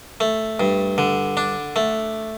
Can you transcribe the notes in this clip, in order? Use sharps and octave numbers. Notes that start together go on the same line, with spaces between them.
A3
G2
D3
D4
A3